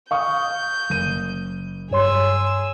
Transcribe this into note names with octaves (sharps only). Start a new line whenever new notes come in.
F5 C#6 D#6 G6
F#1 D#7
G2 G#4 C#5 C6 E6